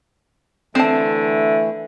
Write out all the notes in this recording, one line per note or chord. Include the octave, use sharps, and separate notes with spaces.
D3 E3 A3 C4 A5